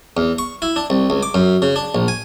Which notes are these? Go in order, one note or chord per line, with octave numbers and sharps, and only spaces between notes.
E2
C#6
E4
D4
C2
C#2
D6
F#2
C#3
D4
A#1
G#5